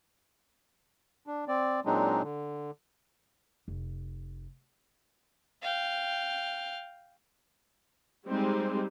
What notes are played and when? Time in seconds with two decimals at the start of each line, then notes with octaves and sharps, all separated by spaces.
1.27 D4
1.48 C4 D5
1.85 A#2 F#3 G#3 C4 D4 D#4
2.23 D3
3.68 F1
5.62 F5 G5
8.26 G3 G#3 C4 D#4 C5